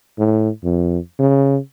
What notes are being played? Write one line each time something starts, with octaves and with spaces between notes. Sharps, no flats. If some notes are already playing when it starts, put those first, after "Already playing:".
A2
F2
C#3